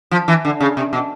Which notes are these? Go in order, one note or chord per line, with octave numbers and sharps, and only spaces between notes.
F3
E3
D3
C#3
C3
B2